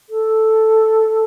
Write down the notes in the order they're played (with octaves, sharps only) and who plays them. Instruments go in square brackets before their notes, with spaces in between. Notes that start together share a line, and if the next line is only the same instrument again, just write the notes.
[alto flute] A4